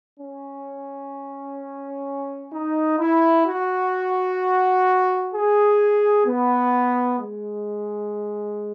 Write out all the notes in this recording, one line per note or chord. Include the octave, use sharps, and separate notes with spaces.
C#4
D#4
E4
F#4
G#4
B3
G#3